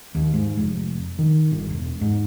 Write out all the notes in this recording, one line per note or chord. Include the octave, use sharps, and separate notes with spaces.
D#2
G#2
F1
D#3
G1
E1
G#2